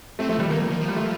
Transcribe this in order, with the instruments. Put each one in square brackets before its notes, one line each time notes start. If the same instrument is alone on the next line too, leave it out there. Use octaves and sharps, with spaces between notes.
[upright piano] A3 [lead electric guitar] C4
[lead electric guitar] F3 [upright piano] A3
[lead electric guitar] D#3 [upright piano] G3
[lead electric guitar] D#3 [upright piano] A#3
[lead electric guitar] F3
D#3
F3
[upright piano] G3
A3